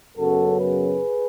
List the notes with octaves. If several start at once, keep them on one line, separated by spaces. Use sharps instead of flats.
F#2 C#3 F#3 B3 F#4 A4
G#4 B4